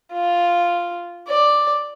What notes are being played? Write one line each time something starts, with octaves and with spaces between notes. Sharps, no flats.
F4
D5